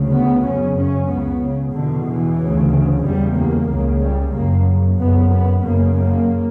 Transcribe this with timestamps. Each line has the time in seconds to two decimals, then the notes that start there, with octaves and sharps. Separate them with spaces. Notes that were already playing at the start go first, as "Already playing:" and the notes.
Already playing: D2 C#3
0.13 B3
0.45 F#2 C#3 C#4
0.77 C#4
1.10 C#2 C#3 B3
1.43 C#3
1.75 E2 B2 D3
2.07 E3
2.40 D2 C#3
3.05 E2 C#3 G3
3.37 A#3
3.69 C#2 C#3
4.02 G3
4.34 F#2 C#3 A#3
4.99 F#2 C#3 B3
5.32 B3
5.64 F#2 C#3 A#3
5.96 A#3